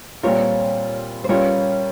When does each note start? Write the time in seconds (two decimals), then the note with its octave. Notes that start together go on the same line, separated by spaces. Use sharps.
0.23 A#2 G3 C4 F4 A#4 C#5
1.24 C5
1.29 G3 C#4 F4 A#4 C#5